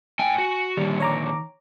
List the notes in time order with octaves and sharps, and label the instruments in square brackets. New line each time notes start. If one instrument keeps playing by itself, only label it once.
[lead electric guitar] A2 G5 [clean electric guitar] G#5
[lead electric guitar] F#4
[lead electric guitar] A#2 D3 [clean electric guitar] D#3 [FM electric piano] G3
[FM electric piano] C#5 A#5 D6